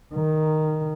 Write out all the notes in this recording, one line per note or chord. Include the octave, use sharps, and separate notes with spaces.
D#3